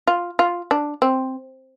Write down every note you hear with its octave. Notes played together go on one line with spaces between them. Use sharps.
F4
F4
D4
C4